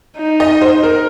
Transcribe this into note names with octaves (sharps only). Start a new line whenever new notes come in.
D#4
D#5
C5
A#4